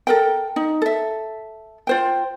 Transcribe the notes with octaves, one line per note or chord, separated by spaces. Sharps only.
A4 A#4 G5
D#4
A4 E5
F4 C5 G5